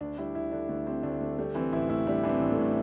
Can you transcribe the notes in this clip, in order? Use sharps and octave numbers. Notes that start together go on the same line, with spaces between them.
D2 D4
G3 E4
D2 E4
D3 D4
D2 A3
G3 C4
D2 D4
D3 A3
G3 A3
E3 C4
A1 E4
A2 E4
G3 D4
E3 D4
C4
A1
A3
A2